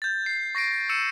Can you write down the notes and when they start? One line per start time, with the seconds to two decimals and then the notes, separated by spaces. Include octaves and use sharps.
0.02 G6 A6
0.26 C7
0.55 C#6 A#6 C7 D7
0.89 E6 C#7 D#7 E7